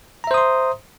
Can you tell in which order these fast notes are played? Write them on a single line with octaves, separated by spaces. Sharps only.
A#5 E5 C5 D#6 C6